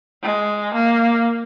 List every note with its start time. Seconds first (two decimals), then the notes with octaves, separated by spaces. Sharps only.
0.23 G#3
0.74 A#3